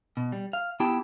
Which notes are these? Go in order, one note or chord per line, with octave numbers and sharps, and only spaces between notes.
B2
G3
F5
B3 E4 G4 G5 A5